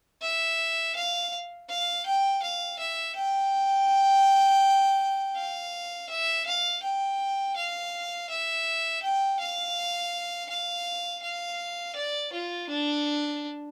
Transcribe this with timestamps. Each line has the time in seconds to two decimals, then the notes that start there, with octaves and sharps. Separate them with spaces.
0.22 E5
0.96 F5
1.69 F5
2.06 G5
2.43 F5
2.79 E5
3.15 G5
5.36 F5
6.09 E5
6.46 F5
6.83 G5
7.56 F5
8.30 E5
9.03 G5
9.40 F5
10.49 F5
11.22 F5
11.96 D5
12.33 F4
12.69 D4